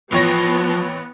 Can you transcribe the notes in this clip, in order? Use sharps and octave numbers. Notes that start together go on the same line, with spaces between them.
A1 F3 B3 C#5 A#6